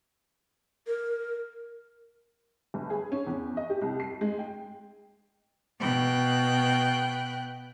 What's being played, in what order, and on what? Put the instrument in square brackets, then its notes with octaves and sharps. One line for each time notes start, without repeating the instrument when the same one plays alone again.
[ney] A#4
[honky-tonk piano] G1
G#4
C#4
E2
D#5
G4
C2
C7
G#3
G5
[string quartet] B2 G5 F#6